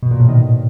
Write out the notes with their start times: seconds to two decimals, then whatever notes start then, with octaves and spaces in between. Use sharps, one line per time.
0.03 B2
0.11 A#2
0.20 A2
0.29 D#3